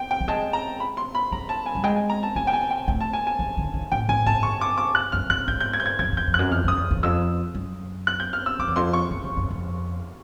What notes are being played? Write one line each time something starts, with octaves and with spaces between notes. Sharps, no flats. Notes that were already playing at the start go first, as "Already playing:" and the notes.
Already playing: G5
G5
G3
G#3 A5
A#5
B5
C6
B5
G3 A#5
A5
G#5
G3
G#3 G5
G#5
A#5
A5
A#3 G#5
G5
G#5
G5
A3 G5
A5
G#5
G#5
D#3
D3
D#3
A2 G5
A2 G#5
G#2 A5
G2 C#6
D6
D6
F#6
F#2 F6
G2 F#6
G#2 G6
G6
G#6
G6
G#6
F#2 G#6
F2
G6
F2
F#6
F#2
F2 F6
F#2 D#6
E2
E2
F2 E6
F#2
F#6
G6
F6
E6
F2 D6
E2
F2 C6
C#6
F2
F2
F#2
F2